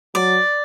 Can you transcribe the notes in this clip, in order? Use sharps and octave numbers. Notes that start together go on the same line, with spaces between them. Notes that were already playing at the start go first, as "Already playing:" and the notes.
F#3 D5